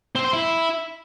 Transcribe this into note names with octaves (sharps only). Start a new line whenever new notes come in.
C4
C5
E4